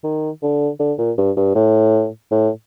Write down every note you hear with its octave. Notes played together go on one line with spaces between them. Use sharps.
D#3
D3
D3
A#2
G2
G2
A2
A2